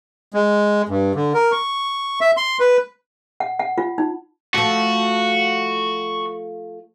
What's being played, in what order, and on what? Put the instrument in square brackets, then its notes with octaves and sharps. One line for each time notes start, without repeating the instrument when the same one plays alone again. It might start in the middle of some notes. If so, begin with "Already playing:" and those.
[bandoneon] G#3
G2
D3
A#4
C#6
E5
C6
B4
[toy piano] F#5
F#5
F4
D#4
[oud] F3 A3 [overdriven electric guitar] F#4